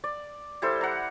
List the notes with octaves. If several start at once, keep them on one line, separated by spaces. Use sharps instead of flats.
D5
G3 E4 A4 C5
F#5 A#5